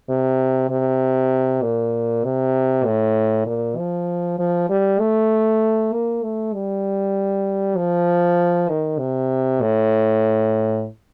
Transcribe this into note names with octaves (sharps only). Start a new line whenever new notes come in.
C3
C3
A#2
C3
A2
A#2
F3
F3
G3
A3
A#3
A3
G3
F3
D#3
C3
A2